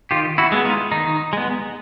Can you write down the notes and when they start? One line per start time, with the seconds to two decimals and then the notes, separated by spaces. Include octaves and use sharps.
0.11 D#3 F4 G4
0.38 E4 F#4
0.52 G#3 B3
0.65 D#4 F4
0.92 D#3 D#4
1.33 G#3 B3